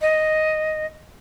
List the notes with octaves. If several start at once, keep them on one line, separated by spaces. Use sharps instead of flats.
D#5